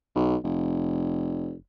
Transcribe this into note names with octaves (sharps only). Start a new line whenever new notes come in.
B1
F1